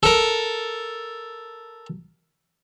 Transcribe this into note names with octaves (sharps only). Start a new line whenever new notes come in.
A4 A#4